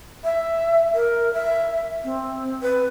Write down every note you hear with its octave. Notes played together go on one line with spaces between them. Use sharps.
E5
A#4
E5
C4
B4